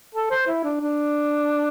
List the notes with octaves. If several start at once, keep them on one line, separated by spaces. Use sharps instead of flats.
A4
C5
E4
D4
D4